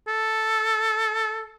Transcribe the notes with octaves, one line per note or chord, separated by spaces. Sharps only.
A4